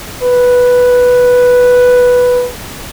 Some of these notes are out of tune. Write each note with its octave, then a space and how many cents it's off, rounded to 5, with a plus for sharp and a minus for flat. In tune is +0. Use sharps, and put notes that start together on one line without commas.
B4 +0